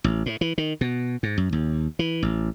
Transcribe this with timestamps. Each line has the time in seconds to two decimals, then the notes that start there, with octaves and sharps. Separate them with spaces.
0.04 A1
0.26 A2
0.41 E3
0.58 D#3
0.81 B2
1.23 G#2
1.38 F#2
1.53 D#2
1.99 E3
2.22 A1